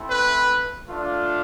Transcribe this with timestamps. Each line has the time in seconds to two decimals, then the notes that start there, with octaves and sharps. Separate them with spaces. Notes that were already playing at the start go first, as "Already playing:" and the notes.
Already playing: A3 C4 E4
0.10 B4
0.89 A3 D4 F4